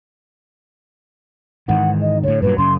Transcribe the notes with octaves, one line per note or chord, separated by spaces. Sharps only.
G#2 D#3 E3 F#5
D#5
A2 D3 C#5
G2 A#2 F#3 B4
F#2 C#3 C6